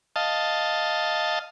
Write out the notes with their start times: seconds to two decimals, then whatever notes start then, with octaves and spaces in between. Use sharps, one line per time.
0.16 D#5 F5 A5